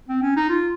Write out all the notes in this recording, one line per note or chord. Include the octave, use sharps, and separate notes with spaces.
C4
C#4
D#4
F4